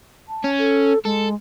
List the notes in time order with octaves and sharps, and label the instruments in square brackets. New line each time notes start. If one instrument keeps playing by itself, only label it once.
[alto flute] A5
[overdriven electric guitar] C#4
[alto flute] A4
[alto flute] G#3 [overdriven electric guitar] A4